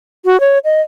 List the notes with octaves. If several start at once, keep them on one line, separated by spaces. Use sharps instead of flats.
F#4
C#5
D#5